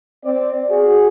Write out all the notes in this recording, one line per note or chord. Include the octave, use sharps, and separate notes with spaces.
C4 D5
F#4 G#4